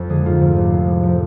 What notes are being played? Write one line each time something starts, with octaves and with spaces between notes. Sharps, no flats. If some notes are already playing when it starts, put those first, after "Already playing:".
Already playing: F2 F3 F4
D3 G#3 G#4
G#2 F4
F3 A3
C2
C3 G#3
A2
F3 A3